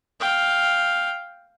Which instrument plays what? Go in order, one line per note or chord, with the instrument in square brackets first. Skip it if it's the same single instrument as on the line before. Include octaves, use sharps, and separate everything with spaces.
[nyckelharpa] F5 G5